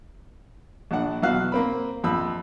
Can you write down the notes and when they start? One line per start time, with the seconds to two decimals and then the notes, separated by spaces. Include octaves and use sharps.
0.91 A#1 D4 F#5
1.23 B1 E3 F#4 F5 F#6
1.52 A#3 C4 B5
2.03 A#1 F2 B5 E6